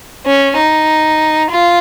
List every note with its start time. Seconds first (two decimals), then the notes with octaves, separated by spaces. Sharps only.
0.26 C#4
0.57 D#4
1.50 F4